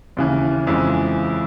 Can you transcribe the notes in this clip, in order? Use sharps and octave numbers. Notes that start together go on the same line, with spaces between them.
D#2 C#3 E3
F2 C#3 E3 G#3